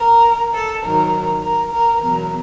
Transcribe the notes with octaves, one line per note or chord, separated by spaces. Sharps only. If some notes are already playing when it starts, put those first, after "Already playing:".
Already playing: A#4
A4
G#2 D#3 F#3 A#4
A#4
A#4
E2 B2 F#3 A#4